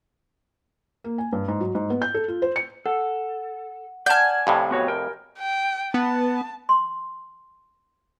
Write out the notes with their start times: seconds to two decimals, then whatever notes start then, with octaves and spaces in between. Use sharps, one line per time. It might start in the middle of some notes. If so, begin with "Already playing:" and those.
1.04 A#3
1.18 G#5
1.33 G2
1.48 G#2
1.60 F#3
1.75 G#2
1.90 B3
2.02 G6
2.14 A4
2.28 F4
2.42 C5
2.56 C#7
2.86 A4 F#5
4.06 D5 F#5 G#5 A5 F6 G6
4.47 F2 A2 C3 G4 F5 B5
4.71 B3 F#4 C#5
4.88 A#4 G5
5.39 G5
5.94 B3 A5
6.69 C6